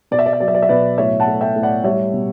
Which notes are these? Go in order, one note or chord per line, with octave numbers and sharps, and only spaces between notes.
B2 D5
E5
D5
E5
F#3 D5
E5
D5
E5
B2 B4 D5
A2 C#5 E5
F#5 A5
A3
E5 G5
A2
D5 F#5
G3 C#5 E5
B2